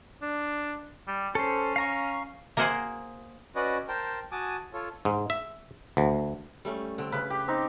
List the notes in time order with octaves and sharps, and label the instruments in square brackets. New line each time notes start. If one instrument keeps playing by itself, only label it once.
[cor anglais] D4
G3
[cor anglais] C#4 [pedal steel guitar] A4 C5
[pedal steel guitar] F5 A#5 C#6
[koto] A#3 G#4 A#4 C5 F#5 G#5
[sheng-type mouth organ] C#4 F#4 B4 D5 D#5
A#4 C5 G5 A5
F#4 G#5 A5 D6 D#6
F4 A4 C#5
[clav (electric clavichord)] G#2
E5
D2
[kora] G3 A3 C#4
D3 C4
[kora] C#3 [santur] B4 B5
[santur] G4
C4 D#4